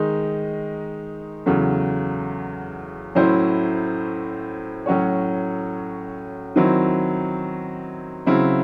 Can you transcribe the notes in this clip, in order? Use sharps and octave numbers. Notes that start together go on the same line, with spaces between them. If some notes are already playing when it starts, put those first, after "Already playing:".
Already playing: D#3 G#3 D#4
E2 C#3 F#3 A3
A2 F#3 C#4 E4 C5
A2 F#3 C#4 F#4 C#5
D#3 F#3 C4 E4
C#3 F#3 C4 E4